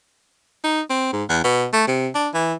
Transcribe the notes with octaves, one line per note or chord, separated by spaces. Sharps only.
D#4
C4
G#2
E2
B2
A3
C3
D4
E3